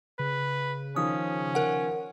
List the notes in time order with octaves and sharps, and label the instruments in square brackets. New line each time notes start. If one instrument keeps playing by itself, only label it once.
[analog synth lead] C#3 [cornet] B4
[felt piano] D#3 F3 [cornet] C#4 [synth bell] D#6
[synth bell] A#4 F#5